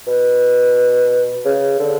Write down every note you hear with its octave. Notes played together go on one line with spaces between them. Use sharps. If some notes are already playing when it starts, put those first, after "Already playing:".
B2
C#3
D3